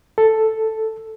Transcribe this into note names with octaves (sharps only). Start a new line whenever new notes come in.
A4